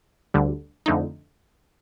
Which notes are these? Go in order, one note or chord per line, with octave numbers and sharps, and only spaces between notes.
D2 D3 G3
F2 D3 A3 D#4